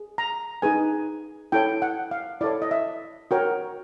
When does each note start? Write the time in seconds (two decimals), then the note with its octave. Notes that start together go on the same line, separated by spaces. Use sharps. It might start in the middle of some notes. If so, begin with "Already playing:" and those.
Already playing: G#4
0.18 A#5
0.62 D#4 G#4 B4 G#5
1.52 E4 A4 C#5 G5
1.82 F#5
2.11 F5
2.41 E4 A4 C#5 D5
2.62 D#5
2.71 E5
3.31 F#4 A#4 C#5 G5